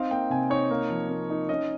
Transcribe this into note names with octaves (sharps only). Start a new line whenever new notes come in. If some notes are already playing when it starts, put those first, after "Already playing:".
Already playing: C4 D#4 F5
A#3 G5
C3 G#5
D#4 C#5
A#3
F3
A#3
D#4
C#4 D#5